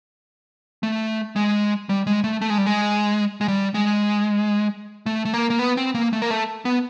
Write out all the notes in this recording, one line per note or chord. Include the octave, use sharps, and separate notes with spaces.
A3
G#3
G3
G#3
A3
A3
G#3
G3
G#3
G#3
G3
G#3
A3
A3
A#3
A#3
B3
C4
A#3
A3
A#3
A3
B3